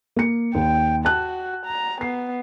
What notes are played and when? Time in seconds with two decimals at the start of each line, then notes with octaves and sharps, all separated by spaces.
0.16 A#3 C#7
0.55 D#2 G5
1.05 F#4 A5 F#6
1.66 A#5
2.01 B3 C7